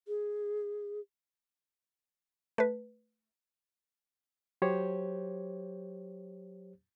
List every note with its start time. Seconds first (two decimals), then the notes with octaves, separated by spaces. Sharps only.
0.08 G#4
2.58 A3 B4
4.62 F#3 G4 C5 C#5